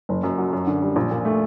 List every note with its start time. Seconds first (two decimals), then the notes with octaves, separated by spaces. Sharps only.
0.09 F#1
0.23 F#2
0.38 F#3
0.53 F#2
0.67 D3
0.82 G3
0.96 A#1
1.11 A#2
1.25 A3